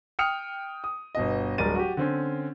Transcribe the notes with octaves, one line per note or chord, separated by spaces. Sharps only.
G5 D#6 F6 C#7 F7
D#6
G1 B2 D#5
D1 G3 G#3 A#4 A6 D#7
F#4 G4
D3 C4 C#4